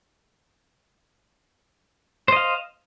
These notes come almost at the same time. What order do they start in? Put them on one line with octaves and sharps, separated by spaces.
C5 D#5 F5